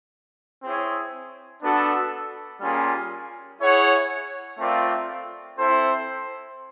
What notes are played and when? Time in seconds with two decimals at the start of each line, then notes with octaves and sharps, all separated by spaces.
0.63 C4 E4 G#4 C#5
1.62 B3 D4 F#4 A4
2.61 G3 A#3 C#4 F4 G#4
3.59 E4 G#4 C#5 F#5
4.58 A3 C4 F4 A#4 D5
5.57 C4 E4 A4 C5